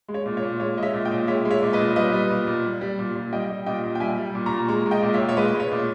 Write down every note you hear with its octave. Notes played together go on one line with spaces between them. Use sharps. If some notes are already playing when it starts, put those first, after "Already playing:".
G#3
C#5
A#2
C#5
A#2
G#3 C#5
G#3 D#5
C#5 E5
A#2
D#5 G5
A#2
G#3 C#5 E5
G#3
C#5 E5
A#2
B4 D#5
A#2
G3 B4 D#5
G3
A#2
A#2
G3
G3
A#2
A#2
G3 D#5 G5
G3
A#2 D#5 G5
A#2
G5
G3 E5 G#5
G3
A#2
A#5 C#6
A#2
G#3 A#5 C#6
G#3
D#5 G5
A#2
C#5 E5
A#2
C#5
G#3 B4 D#5
G#3
C#5
A#2